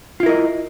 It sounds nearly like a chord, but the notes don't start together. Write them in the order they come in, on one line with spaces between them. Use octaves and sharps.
F4 E4 A#4 D#5